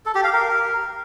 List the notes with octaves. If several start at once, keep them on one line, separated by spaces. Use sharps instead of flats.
A4
G4
F5
A#4